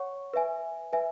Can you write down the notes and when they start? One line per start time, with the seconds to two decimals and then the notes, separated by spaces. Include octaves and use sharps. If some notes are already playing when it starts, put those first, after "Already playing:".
Already playing: C#5 F#5 C#6
0.34 B4 E5 G#5
0.93 B4 E5 G#5